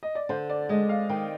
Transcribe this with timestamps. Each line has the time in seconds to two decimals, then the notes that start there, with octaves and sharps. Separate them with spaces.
0.03 D#5
0.15 D5
0.29 D3 C5
0.50 D5
0.69 G#3 D#5
0.89 F5
1.09 D#3 G5